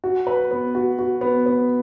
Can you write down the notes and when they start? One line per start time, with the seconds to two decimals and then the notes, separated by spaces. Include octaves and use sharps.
0.04 F#4
0.27 B4
0.51 B3
0.75 F#4
0.99 F#4
1.21 B3
1.46 B3